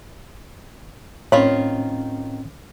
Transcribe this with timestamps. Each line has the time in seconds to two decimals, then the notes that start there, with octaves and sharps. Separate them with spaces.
1.32 A2 D#3 C4 C#4 F4 C#5 B5